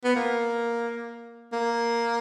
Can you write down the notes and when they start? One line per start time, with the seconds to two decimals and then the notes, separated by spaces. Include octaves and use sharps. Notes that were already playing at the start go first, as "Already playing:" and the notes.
0.04 B3
0.16 A#3
1.53 A#3